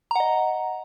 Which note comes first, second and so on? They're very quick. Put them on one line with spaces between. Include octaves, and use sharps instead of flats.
A#5 F#5 D#5